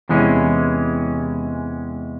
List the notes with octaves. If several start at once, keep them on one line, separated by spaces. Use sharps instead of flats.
E2 C3 E3 G#3 C#4